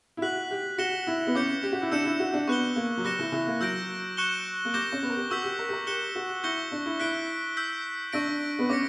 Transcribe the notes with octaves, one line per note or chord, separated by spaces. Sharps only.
E4
F#4 F#6 B6 F#7
G4
F#4 A#6 C#7 E7 G7
E4
B3
C#4 D6 G6 C#7
G4
F#4
E4
D4 E6 G6 C#7 E7
E4
F#4
D4
B3 C#6 F#6 C#7 E7 G7
A#3
F#3
G3 D6 F#6 A#6 C#7 E7
E3
E3
A#3
F#3 E6 G6 A#6 D7
C#6 F#6 C#7 E7 G7
A#3
G3 D6 G6 A#6 E7 G7
C#4
B3
A#4
G4
F#4 C#6 E6 G6 B6
G4
A#4
G4
A#4
G4 F#6 C#7 E7 G7
F#4
E4 C#6 G6 A#6 C#7 G7
D4
E4
E4 F#6 B6 D7 G7
E6 G6 B6
D4 C#6 E6 A#6 D7
B3
C#4 D6 A#6 C#7